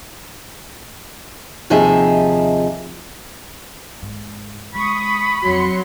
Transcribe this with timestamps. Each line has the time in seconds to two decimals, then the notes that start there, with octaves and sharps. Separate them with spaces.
1.70 D#2 C3 F3 D#4 G#4 E5
4.02 G#2
4.74 G#3 B5 C#6 D#6
5.42 F2 F3 F#3 C6 C#7